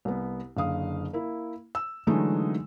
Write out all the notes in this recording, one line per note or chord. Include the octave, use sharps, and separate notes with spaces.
C2 B3
F#1 D3 F5 D#6
A#3 E4
E6
D3 E3 F#3 G#3 A3 D#4